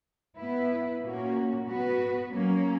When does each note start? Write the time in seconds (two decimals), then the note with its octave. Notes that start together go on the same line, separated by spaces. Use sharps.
0.37 B3 E4 B4
1.01 A#2 A#3 C#4 F#4
1.67 B3 F#4 B4
2.31 F#3 A#3 C#4